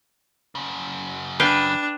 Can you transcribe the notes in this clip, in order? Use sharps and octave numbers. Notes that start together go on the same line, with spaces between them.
F#2 C#3
D4 B4 F5 G5